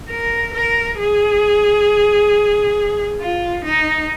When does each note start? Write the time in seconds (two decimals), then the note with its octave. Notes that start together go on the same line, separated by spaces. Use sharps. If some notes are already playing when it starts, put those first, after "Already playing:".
0.09 A#4
0.54 A#4
0.99 G#4
3.21 F4
3.65 D#4